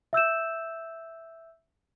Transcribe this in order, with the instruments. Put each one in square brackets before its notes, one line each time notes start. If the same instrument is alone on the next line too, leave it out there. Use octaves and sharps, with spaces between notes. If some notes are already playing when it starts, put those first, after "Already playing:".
[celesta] E5 E6 G6 E7